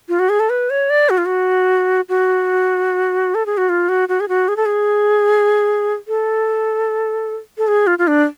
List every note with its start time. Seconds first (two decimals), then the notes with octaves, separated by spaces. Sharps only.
0.09 F4
0.19 F#4
0.29 G#4
0.40 A4
0.50 B4
0.70 C#5
0.90 D5
1.10 F#4
1.18 F4
1.26 F#4
2.09 F#4
3.35 A4
3.46 G#4
3.58 F#4
3.69 F4
3.89 F#4
4.09 F#4
4.20 G#4
4.29 F#4
4.48 G#4
4.57 A4
4.66 G#4
6.08 A4
7.58 A4
7.67 G#4
7.87 F4
7.99 F4
8.07 D4